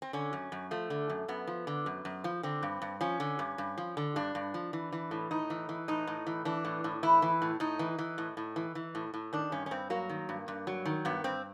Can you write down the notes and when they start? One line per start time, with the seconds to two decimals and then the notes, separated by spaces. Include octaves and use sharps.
0.02 C4
0.13 D3 C#4
0.33 F#2
0.52 F#2
0.71 F3 A3
0.90 D3
1.10 F#2
1.28 F#2 B3
1.47 F3
1.67 D3
1.86 F#2
2.05 F#2
2.24 F3
2.43 D3 C4
2.63 G2
2.82 G2
3.01 F3 C#4
3.20 D3
3.39 G2
3.58 G2
3.78 F3
3.97 D3
4.16 G2 D4
4.35 G2
4.54 F3
4.73 E3
4.92 E3
5.11 A2
5.31 A2 D#4
5.50 E3
5.69 E3
5.88 A2 D#4
6.07 A2
6.27 E3
6.45 E3 D4
6.65 A2
6.84 A2
7.03 E3 E4
7.22 E3
7.42 A2
7.60 A2 D#4
7.79 E3
7.99 E3
8.18 A2
8.37 A2
8.56 E3
8.75 E3
8.95 A2
9.14 A2
9.33 D#3 D4
9.52 G2 C#4
9.66 C#4
9.71 G2 C4
9.90 F#3 A#3
10.09 D#3
10.29 G2
10.48 G2
10.67 F#3
10.85 D#3
11.05 G2 B3
11.24 G2 C4